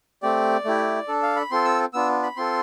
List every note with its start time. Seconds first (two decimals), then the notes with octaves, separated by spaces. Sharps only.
0.22 A3 C4 G4 D5
0.65 A3 E4 G4
1.08 D4 A4
1.23 F5
1.36 B5
1.51 C4 F4 A4 C6
1.65 E6
1.93 B3 D4 F4 E6
2.23 B5
2.37 C4 F4 A4 C6